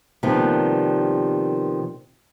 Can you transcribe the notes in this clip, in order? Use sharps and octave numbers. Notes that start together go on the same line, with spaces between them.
C3 D#3 F3 G3 A#3 B3